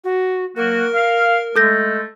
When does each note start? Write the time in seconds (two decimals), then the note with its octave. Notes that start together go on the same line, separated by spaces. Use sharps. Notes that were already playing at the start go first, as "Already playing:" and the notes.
0.04 F#4
0.56 F#3 A#3 F#4 A#4
0.94 F5
1.56 G#3 A3 A4 G6 A#6